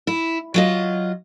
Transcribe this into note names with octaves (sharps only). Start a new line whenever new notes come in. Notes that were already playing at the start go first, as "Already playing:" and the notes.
E4
F#3 F4 D#5